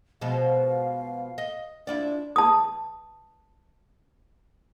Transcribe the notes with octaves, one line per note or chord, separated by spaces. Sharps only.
B2 F3 G#3 F5
D#5
D4 E4 F4 D5
A5 D#6